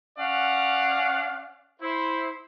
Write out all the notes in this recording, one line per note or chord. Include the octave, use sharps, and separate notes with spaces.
C#4 D5 F5 F#5
E4 C5